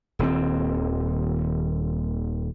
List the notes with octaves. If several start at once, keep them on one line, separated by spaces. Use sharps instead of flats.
D#1 D#2 C4